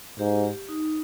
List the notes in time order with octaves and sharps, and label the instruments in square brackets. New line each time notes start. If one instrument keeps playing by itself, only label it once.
[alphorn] G#2 [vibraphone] G4
[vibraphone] G4
D#4